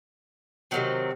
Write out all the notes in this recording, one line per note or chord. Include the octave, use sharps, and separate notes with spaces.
C3 D#3 F#3 C4